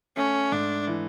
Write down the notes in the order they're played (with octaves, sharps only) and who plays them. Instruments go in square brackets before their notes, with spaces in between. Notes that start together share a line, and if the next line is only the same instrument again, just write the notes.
[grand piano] A3 [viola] C#4
[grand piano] G#2 [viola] D4
[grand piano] E3